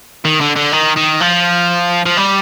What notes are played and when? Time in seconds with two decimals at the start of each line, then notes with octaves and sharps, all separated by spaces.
0.25 D#3
0.41 D3
0.56 D3
0.73 D#3
0.97 D#3
1.21 F3
2.06 F3
2.17 G3